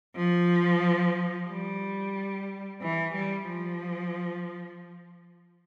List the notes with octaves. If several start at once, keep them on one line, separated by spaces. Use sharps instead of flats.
F3
G3
E3
G3
F3